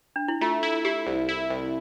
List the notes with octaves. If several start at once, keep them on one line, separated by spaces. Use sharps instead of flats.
D4
E4
A3 F4
E4
E4 G4
C2
E4
C2